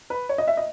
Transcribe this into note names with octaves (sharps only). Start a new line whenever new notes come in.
B4
C#5
D#5
E5
D#5